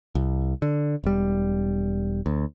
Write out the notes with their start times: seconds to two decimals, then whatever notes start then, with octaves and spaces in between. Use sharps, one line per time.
0.15 C2
0.62 D3
1.04 E1 G3
2.26 D2